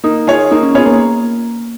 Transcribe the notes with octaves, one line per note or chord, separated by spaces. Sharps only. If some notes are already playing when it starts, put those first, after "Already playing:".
A#3 D#4
F4 G#4 C#5
A#3 D#4
C#4
B3 F4 G#4 C#5
A#3